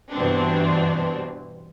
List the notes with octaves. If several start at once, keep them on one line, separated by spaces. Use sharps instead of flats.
G2 B2 E3 C4 D4